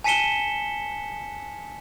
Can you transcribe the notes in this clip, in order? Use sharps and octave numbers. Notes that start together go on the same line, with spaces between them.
G#5 A5 B6 C#7 E7 G7